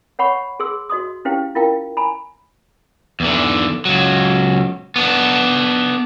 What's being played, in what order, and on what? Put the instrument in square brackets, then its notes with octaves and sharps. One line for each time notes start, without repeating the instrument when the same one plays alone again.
[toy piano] C#5 F#5 B5 C#6
G#4 C6 E6
F#4 D#5 C6 D#6
C#4 E4 G4 C5 F5 G5
E4 F4 A#4 F5 G5
G#5 A#5 B5
[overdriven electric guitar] E2 D3
C#2 F#3
B3 D4